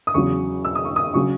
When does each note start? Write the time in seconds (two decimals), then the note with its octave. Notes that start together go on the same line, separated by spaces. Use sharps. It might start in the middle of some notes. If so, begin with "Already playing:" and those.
0.07 D#6
0.14 E2 C#3 F#3 C#6
0.65 E6
0.75 D#6
0.85 C#6
0.96 D#6
1.14 C#3 F#3 C#6